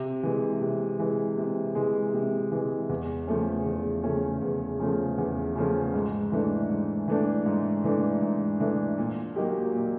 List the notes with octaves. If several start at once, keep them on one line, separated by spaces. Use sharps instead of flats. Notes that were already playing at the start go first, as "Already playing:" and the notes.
Already playing: C3
E3 G#3
C3
E3 G#3
C3
E3 G#3
C3
E3 G#3
E2
C#3 F3 A3 C#4
E2
C#3 F3 A3 C#4
E2
C#3 F3 A3 C#4
E2
C#3 F3 A3 C#4
G#2
E3 A3 D4
G#2
E3 A3 D4
G#2
E3 A3 D4
G#2
E3 A3 D4
A#2
F#3 A#3 D#4 G4
A#2